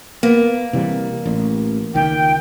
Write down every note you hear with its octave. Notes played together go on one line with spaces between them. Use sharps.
A#3 B3
C3 E3 G3
A1
C#2 D#3 G5